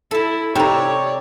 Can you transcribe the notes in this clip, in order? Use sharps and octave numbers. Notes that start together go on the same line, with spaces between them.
E4 A4 A5
C3 D#4 G4 A4 C#5 D5 A#5